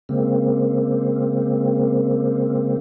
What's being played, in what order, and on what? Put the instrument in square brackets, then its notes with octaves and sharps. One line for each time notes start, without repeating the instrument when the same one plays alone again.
[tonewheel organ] C#3 G#3 A#3 C4